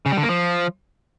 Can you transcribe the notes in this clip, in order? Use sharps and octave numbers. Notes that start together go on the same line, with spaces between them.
C#3
G3
D3
A#3
F3